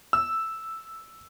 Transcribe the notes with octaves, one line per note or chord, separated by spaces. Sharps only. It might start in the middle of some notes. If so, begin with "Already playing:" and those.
E6